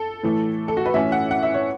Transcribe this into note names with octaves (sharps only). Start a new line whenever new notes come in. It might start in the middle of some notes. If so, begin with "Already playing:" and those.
Already playing: A4
A2 E3 A3
A4
F#4
B4
A2 E3 C#4 E5
F#5
F#5
E5
C#5